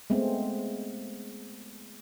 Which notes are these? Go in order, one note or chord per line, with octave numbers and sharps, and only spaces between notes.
G#3 A3 B3 C4